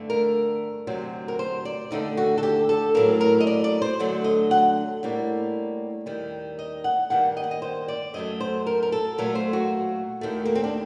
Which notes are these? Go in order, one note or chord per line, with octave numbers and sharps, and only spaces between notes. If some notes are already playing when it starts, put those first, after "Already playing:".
Already playing: G2 D3 A3
A#4
D2 C3 F#3
A#4
C5
D5
D#2 D3 A3 D#4
F#4
A4
G4
A4
A2 F#3 A#3 A#4
A#4
D#5
D5
D5
C5
D2 D3 F#3 A3
D#5
F#5
A2 G3 A#3
D#2 D#3 G3
D#5
F#5
G2 D#3 G3 A#3 F#5
D#5
F#5
D#5
C5
D5
F#2 F#3 A3 D#5
C5
A#4
A#4
A4
A#2 F#3 A3 A#4
C5
F#4
D#2 D#3 A3
A#3
C4
D4